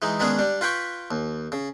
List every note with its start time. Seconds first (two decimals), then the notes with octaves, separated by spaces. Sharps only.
0.02 E3 G#3 D#4
0.20 D#3 G#3 B3 C#4 D4 G#4
0.39 G3 D4
0.61 F4 B4 G5 B5 C#6
1.11 D#2
1.52 C#3